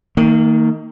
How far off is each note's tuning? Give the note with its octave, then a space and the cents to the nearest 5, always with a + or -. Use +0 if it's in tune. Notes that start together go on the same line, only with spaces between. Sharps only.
D#3 +20 A#3 -30